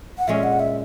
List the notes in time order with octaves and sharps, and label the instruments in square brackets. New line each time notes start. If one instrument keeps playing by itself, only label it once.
[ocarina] F#5
[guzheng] A#2 G#3 C#4 [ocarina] E5
[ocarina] F#5
E5